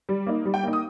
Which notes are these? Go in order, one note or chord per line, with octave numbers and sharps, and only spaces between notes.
G3
A#3 D#4
G3
G5
A#3 D#4
D#6